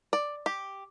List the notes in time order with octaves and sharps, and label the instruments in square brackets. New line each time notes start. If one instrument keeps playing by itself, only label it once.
[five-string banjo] D5
G4